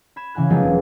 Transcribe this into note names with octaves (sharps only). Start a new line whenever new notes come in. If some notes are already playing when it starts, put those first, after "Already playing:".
B5 G#6 E7
C#3 E3 F#5 G#5 F#6
F3 F#3 G#3 A#3 B3 D#4
E1